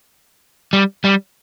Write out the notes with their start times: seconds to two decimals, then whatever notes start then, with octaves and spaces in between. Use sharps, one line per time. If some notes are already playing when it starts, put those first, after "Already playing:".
0.73 G3
1.05 G3